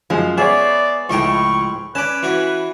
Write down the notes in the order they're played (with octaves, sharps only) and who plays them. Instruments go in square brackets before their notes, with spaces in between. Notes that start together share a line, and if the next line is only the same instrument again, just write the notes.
[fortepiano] F#2 G#3 [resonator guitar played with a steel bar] F3
[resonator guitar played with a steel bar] B3 [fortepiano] G#4 C#5 [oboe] D5 [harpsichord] E5
[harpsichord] C#2 D#5 G5 [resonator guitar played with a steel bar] A2 F3 [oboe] C#6
[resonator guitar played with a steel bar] C#4 [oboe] B4 [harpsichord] D5 A5
[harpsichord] E3 F#4 G#5